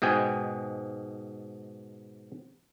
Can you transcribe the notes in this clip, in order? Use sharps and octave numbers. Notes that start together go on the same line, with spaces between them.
G#2 B2 D#5 G5 G#5